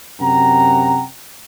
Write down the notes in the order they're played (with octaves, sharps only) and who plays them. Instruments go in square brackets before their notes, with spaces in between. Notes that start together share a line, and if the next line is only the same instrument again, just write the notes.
[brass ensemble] F#2 C3 F#5 G5 A#5